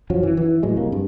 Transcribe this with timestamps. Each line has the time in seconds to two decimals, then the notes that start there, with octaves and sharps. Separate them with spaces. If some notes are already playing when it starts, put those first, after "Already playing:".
0.10 F#2 F3 F#3
0.23 E3
0.37 E3
0.63 A2 F#3 G#3
0.76 C2 C3 A#3
0.92 G2